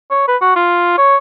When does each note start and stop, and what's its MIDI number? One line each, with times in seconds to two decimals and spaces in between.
0.11 0.27 73
0.28 0.36 71
0.42 0.54 66
0.56 0.94 65
0.98 1.17 73